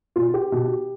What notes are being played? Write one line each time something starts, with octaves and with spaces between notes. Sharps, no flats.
B2 F4
G4
B2